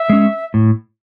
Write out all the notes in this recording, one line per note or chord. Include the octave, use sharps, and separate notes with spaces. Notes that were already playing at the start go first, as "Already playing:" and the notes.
Already playing: E5
G#3 C#4
A2